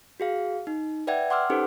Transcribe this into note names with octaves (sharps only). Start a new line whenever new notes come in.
F#4 G#4 F5
D#4
B4 D5 E5 F#5 G5 G#6
F#5 C6 D6 E6 F6
C#4 D#4 G4 A4 B4 C5